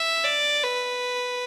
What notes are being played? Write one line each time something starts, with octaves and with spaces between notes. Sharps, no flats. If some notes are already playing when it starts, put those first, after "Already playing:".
Already playing: E5
D5
B4